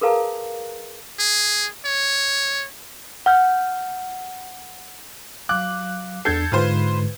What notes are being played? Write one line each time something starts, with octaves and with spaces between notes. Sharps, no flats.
G#4 A#4 B4 F5 A5 A#5
G#4
C#5
F#5 F6 G6
F#3 F5 D6 F#6
E2 D4 A4 G6 G#6 C7
G#2 D3 G#3 F4 B4 C5